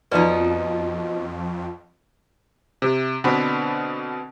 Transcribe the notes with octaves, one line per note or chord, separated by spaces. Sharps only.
F2 B2 F3 D#4 A4 B4 D5
C3
B2 D3 B3 C4 D4 B5